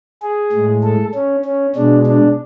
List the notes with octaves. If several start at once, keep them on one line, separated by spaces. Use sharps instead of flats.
G#4
A2 G#3
A4
C#4
C#4
B2 G#3 D4
D4